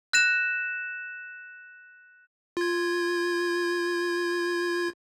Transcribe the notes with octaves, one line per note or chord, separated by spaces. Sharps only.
F#6 A#6 E7
F4 G#6